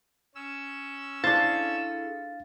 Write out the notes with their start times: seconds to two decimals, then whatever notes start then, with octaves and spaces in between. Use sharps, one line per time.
0.35 C#4 E6
1.24 D4 E4 G#4 A4 C5 F5 A6